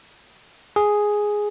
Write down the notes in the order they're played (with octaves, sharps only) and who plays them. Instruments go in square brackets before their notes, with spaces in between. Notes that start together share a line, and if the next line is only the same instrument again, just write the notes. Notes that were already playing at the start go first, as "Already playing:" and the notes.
[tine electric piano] G#4